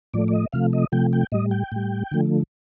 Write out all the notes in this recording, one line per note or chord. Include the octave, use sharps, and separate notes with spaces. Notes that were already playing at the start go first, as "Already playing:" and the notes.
A2 F3 A3 D5
D5
D#5
C3 F3 A3 F5
D#5
C3 F3 A3 G5
G5
A2 G3 D#5
G5
A2 G3
D3 F3 A3